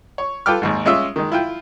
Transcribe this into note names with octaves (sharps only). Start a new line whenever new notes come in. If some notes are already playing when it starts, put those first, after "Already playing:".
C#5
F4 A4 B4 G5 D6 F6
G#1 D#2 G#2
G#3 C#4 F4 E5 E6
D#3 G#3
E4 F4 G5